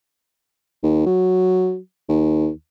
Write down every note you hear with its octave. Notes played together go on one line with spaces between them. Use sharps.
D#2
F#3
D#2